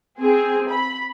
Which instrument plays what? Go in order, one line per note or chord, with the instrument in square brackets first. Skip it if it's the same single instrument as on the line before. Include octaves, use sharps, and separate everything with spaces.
[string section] C4 G#4
B5